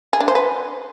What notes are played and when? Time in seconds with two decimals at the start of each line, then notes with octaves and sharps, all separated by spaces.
0.13 G#4
0.20 D4
0.28 C5
0.35 B4